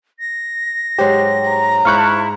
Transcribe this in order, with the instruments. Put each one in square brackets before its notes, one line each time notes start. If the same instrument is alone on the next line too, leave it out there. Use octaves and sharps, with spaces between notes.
[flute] A#6
[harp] G#2 F#3 C5 [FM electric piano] G4
[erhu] A#5
[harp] G#2 G6 [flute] E4 [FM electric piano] F5 C#6 F#6